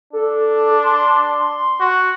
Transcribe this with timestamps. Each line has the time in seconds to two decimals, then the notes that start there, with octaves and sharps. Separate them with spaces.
0.13 D4 A4
0.83 C6
1.80 F#4